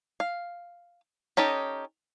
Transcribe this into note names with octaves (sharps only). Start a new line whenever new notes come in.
F5
C#4 D#4 G4 A4 D#5